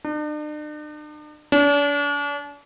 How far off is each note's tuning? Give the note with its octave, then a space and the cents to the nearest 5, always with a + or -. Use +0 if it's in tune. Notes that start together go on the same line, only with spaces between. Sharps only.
D4 +45
D4 -40